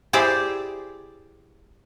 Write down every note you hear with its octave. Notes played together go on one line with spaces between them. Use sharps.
E4 G4 G#4 C5 D5